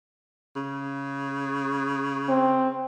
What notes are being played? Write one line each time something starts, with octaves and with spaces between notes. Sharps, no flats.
C#3
C4